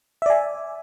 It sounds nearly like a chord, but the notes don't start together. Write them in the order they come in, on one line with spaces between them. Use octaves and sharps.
E5 D5 G#5